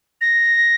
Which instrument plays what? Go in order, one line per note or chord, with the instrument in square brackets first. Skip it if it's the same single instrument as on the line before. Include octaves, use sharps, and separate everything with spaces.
[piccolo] A#6